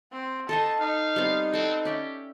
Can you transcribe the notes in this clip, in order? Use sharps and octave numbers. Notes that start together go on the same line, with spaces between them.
C4
D#4 A4 D#5 A5 C6
D#4 F5
G3 B3 C4
C4 A4 F#5
C#4 G4 D5 E5